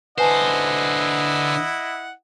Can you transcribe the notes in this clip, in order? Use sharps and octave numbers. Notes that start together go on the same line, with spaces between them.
D3 E4 B4 C5 D#5 F#5 G#5 A5